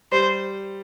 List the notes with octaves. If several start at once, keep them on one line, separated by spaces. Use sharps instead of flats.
G3 C5